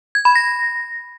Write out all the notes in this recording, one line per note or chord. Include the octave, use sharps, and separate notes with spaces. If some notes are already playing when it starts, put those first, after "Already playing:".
G#6
B5
A#6